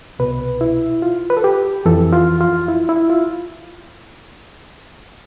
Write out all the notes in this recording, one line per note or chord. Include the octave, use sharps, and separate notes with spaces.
C2 B2 B4
E4
F4
B4
A4
G4
F2 E3 A4
F4
F4
E4
E4
F4